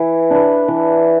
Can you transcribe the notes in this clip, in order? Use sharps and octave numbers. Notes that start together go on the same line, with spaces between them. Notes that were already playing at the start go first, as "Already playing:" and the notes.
Already playing: E3
D4 B4
E3